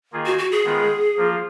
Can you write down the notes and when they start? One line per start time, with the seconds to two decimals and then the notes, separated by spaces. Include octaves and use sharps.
0.13 D#3 A#3 F4 G#4
0.26 F#4
0.38 F#4
0.52 G#4
0.65 D#3 G#3 B3 F4
1.17 F3 A#3 F4